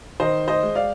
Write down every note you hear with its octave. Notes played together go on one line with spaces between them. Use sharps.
D#3 C5 D#5
C5 D#5
G#3
D5 F5